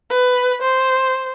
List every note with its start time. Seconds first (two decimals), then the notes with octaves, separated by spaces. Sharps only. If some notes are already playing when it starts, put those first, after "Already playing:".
0.10 B4
0.62 C5